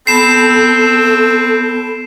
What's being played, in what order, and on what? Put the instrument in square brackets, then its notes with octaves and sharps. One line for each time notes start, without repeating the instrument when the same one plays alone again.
[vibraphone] B3 A5 B5 [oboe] C4 [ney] A4 [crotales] C7 E7